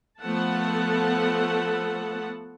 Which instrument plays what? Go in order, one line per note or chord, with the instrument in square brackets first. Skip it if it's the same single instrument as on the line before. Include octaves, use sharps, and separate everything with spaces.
[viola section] F3 A3 B3 A4 F#5 A5